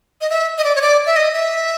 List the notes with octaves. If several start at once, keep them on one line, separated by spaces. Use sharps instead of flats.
D#5
E5
D#5
D5
C#5
D5
E5
D#5
E5